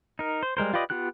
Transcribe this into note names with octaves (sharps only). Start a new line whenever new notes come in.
D#4 A#4
C5
G3 G#3 A#4 C5
F4 G4 B4 D5 D#5
B3 F4 G4 F#6